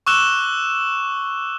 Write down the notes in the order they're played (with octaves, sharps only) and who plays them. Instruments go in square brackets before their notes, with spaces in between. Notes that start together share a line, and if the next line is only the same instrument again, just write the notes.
[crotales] C#6 D6 E6 F#6 E7 G7